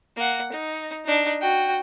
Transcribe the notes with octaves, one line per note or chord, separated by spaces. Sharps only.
A#3 F#5
D#4
D4 D#4
F#4 G5